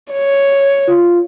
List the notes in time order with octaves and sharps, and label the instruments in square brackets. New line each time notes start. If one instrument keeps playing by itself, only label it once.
[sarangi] C#5
[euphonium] F4